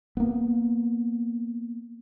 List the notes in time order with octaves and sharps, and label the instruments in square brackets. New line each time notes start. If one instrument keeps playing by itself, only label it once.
[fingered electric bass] A#3 B3